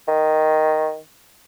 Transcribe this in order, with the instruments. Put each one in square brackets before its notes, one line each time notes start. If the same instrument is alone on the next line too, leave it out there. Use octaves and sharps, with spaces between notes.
[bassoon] D#3